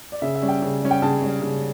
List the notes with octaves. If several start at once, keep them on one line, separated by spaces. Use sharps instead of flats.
D5
C#3 E5
E5
G3 C#4
G5
C#3
G3 C#4
G5
C#3 A5
G3 C#4
C#3